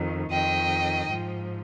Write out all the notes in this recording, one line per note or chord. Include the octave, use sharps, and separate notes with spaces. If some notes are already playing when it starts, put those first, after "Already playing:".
Already playing: F2 D#3
F2 D#3 D#5 G5
G#2 F3